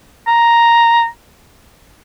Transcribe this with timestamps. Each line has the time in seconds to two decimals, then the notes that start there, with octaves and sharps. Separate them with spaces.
0.27 A#5